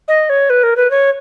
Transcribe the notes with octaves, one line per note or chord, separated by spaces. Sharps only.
D#5
C#5
B4
A#4
B4
C#5